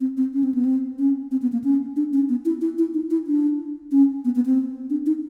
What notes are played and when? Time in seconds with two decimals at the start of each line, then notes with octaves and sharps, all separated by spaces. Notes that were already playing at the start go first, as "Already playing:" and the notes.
0.01 C4
0.17 C4
0.34 C#4
0.43 C4
0.54 B3
0.65 C4
0.99 C#4
1.31 C4
1.42 B3
1.52 A#3
1.64 C#4
1.96 D4
2.13 C#4
2.29 B3
2.45 E4
2.61 E4
2.78 E4
2.94 D#4
3.10 E4
3.27 D4
3.92 C#4
4.25 B3
4.35 B3
4.46 C4
4.90 D4
5.06 D#4